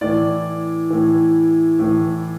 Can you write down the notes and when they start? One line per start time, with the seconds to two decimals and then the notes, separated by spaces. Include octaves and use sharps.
0.01 A2 E3 D5
0.90 A2 E3
1.79 A2 E3